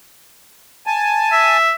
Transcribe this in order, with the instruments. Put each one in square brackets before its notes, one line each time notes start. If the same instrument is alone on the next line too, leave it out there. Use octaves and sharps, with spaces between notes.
[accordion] G#5 A5
[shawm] E5